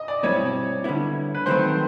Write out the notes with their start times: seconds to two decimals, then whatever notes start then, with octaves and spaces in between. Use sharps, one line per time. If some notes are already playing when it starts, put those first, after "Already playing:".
Already playing: D#5
0.08 D5
0.23 B2 G3 C4 E4 C#5
0.84 D3 G3 B3 E4
1.35 B4
1.46 G2 D#3 F#3 A3 C4 C5